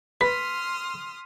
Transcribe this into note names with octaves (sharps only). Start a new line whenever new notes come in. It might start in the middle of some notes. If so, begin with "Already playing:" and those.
B4 C6 D#6 F6 B6